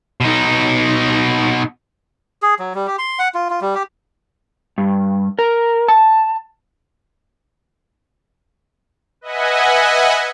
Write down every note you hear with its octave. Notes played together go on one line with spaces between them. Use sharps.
B2 D#4
G#4
F#3
G3
G4
C6
F#5
F4
F4
G3
G4
G2
A#4
A5
B4 D#5 E5 F#5 G#5